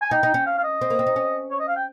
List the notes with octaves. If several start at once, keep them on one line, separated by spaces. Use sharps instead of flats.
G#5
D#4 G5
D#4
C#4
F5
F5
D#5
C4
A#3
C4
D#4
C#4
C#5
D#5
F5
G5